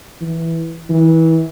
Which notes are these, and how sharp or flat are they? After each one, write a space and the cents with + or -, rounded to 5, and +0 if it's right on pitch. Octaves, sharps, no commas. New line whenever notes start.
E3 +0
E3 -25